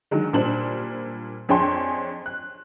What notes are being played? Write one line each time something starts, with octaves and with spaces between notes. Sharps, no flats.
D3 D#3 F#3 G#3
A#2 G3 D4 C5 F#7
F2 D4 G#4 C#5 G5 C6
F#6